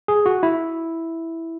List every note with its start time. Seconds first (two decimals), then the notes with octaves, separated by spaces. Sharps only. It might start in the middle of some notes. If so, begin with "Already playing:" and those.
0.08 G#4
0.26 F#4
0.43 E4